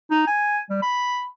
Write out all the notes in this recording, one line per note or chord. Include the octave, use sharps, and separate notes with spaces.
D#4
G#5
G3
B5